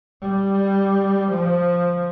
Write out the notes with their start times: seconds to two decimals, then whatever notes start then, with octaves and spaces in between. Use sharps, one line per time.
0.22 G3
1.31 F3